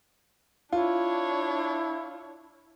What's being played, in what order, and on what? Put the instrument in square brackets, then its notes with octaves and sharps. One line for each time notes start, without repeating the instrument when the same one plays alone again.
[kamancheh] D4 C#5 [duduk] E4 [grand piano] F4